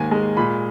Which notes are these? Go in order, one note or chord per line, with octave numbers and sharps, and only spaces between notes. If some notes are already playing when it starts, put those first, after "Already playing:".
Already playing: D#2 G#2 A#3 G#5
G#3
A#2 B5